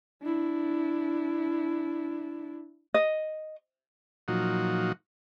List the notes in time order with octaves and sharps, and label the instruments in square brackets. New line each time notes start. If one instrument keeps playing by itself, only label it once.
[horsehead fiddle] D4 E4
[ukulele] D#5
[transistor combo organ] A#2 F3 F#3 D#4 F#4